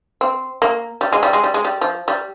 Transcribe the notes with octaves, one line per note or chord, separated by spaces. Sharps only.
C4
A#3
G3
G#3
G3
G#3
G3
G#3
G3
F3
G3